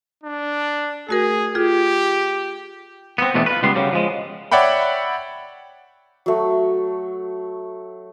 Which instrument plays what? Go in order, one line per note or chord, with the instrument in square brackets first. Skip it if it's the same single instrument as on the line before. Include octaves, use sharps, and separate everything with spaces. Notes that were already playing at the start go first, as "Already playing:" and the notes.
[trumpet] D4
[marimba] A3 F#4 A#4 [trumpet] G#4
[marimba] F4 G#4 [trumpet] G4
[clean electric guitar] B3 C4
E2 B2 A3 B3 C4 D4
F4 B4
C#2 G3 B3 C6
C#3 F#3 G3
F3 G#3
[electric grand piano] C#5 D5 E5 F#5 G5 B5
[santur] F#3 A3